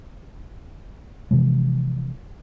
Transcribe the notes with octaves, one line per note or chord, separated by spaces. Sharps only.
C3 E3 F3 G#3